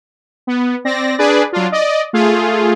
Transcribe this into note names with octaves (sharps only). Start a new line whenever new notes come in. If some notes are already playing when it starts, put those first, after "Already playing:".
B3
C4 D5 A#6
D4 G#4 B4 D5
F#3 D4 F4
D5 D#5
A3 F4 G#4